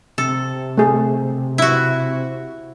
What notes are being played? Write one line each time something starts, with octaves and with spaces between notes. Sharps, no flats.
C3 A4
A3 G#4
E4 F#4